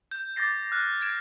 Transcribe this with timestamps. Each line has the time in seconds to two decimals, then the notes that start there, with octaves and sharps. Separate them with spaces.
0.11 G6
0.36 D6 G6 A6 A#6 C7
0.72 F6 F#6
1.01 G#6 D7 E7